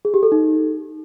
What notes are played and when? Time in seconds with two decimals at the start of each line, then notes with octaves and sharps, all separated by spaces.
0.05 G#4
0.14 G4
0.23 A4
0.32 D#4